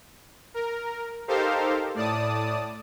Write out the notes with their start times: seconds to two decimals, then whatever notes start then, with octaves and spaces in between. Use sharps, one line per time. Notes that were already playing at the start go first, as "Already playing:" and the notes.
0.54 A#4
1.28 D#4 G4 A4 A#4 C5 F5
1.95 A2 D5 A5 D#6